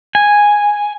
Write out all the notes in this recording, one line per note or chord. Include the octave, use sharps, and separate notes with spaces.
G#5